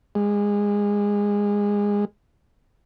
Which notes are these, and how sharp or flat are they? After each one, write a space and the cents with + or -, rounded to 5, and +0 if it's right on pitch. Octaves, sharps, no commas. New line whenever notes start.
G#3 -20